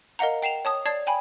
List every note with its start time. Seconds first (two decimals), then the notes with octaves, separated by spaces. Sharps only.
0.19 A#4 D#5 F5 F#5 A#5
0.42 G5 C7 E7 F7
0.65 C#5 A5 D#6
0.86 D5 A5 G#6 C7
1.07 G5 G#5 B5